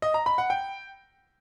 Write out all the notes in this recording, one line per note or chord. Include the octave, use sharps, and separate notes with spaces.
D#5
A#5
B5
F#5
G5